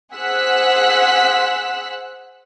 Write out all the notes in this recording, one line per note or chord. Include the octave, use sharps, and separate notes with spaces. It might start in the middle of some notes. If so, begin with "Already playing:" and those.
G#4 C5 F#5 E6 F#6 B6